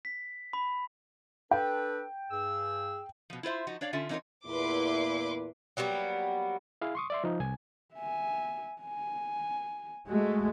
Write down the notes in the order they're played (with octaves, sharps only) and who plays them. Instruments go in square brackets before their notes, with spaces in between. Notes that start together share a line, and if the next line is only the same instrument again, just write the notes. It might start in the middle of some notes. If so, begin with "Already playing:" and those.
[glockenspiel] B6
B5
[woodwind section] D4 A4 B4 [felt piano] G5
[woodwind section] G2 G#4 E6
[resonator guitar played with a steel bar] B2 F3
E4 F4 C5 E5
F3 D#4 F#4
D4 C#5 D5 F5
D3 C#4 F4 E5
E3 C4 D#4 F4 A#4 C#5
[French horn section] E2 A#2 E4 [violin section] B4 C6 D6
[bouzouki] F#3 G3 A#3 B3
[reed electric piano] E4 G#4 F5
C6 C#6 D#6
D5 E5 C6
F3 D#4
C2 G#5
[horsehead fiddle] E5 G#5
G#5
[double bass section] G#3 A3 [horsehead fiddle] F#4